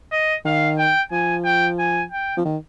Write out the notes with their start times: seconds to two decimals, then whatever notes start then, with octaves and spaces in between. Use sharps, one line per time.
0.12 D#5
0.45 D#3 F5
0.78 G5
1.12 F3 G#5
1.45 G5
1.79 G#5
2.12 G5
2.37 F3
2.45 D#3